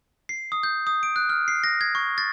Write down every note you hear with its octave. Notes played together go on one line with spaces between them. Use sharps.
C7
D#6
G6
D#6
D7
F#6
F6
C7
A#6
G#6
C#6
A6